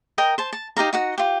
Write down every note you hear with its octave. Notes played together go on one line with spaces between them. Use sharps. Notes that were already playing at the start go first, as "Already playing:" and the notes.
A#4 D#5 G5
C5 A5
A5
D#4 G4 F5 A#5
D#4 F#4 F#5
F4 G4